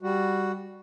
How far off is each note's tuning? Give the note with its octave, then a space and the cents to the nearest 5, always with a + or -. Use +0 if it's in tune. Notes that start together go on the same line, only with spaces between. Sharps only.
G3 +0 F#4 +5